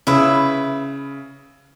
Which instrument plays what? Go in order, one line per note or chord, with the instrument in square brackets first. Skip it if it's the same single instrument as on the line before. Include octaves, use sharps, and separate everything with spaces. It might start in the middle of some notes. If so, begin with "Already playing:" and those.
[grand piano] C#3 [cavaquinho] E4 B4 E5